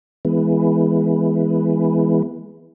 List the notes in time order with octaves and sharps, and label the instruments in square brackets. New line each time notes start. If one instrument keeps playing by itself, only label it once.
[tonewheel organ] E3 G#3 B3